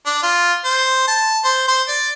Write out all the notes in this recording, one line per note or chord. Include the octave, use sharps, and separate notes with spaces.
D4
F4
C5
A5
C5
C5
D5